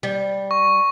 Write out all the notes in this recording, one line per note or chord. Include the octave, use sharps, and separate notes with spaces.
G3
C#6